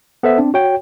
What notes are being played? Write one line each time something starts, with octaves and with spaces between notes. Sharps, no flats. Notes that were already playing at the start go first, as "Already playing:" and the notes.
B3 A4 C5 E5
C4 D4
F#4 C#5 G5